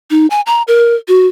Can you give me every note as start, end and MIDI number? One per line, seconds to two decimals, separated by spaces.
0.11 0.27 63
0.30 0.41 80
0.46 0.62 82
0.68 0.95 70
1.08 1.27 66